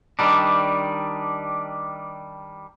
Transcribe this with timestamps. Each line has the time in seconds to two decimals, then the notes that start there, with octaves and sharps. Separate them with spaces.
0.19 D#3 G3 D4